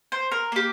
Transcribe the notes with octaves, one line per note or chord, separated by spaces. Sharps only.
C5
A#4
A#3 G4